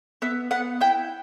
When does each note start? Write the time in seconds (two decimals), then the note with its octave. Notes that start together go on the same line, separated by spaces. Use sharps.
0.22 B3 E5
0.51 B3 F#5
0.81 E4 G5